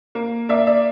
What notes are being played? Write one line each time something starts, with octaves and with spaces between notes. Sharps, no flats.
A#3
A#3 D5 E5
D5 E5